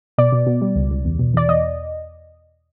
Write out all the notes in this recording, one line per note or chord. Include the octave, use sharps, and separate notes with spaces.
B2 D5
B2
B2
G3
C#2
C#2
E2
B2
E2 D5
E2 D#5